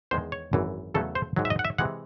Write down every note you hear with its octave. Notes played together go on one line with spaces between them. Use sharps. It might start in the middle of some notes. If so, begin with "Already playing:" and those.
E2 D#3 G#3 C5
C#5
G#1 F#2 E3
E2 C#3 F#3 A3 A4
C5
G#2 D#3 F#3
E5
D#5
F#5
E5
C3 E3 G#3 F#5